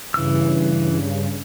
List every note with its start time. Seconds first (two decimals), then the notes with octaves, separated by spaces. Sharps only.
0.14 G2 C#3 E3 E6